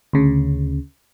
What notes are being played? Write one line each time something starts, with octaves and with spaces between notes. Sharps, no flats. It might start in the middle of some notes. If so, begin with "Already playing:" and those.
D2 C#3